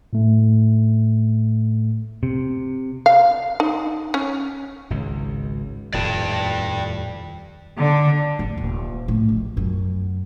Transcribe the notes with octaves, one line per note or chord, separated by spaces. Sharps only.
A2 A3
C3
F5
D#4
C#4
G#1 C#2
D#1 F2 A2 D5 G5 A5
D3
G#1
D#1
A2
A#1
F#2